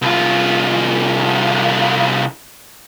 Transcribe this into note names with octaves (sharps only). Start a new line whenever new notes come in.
C2 F4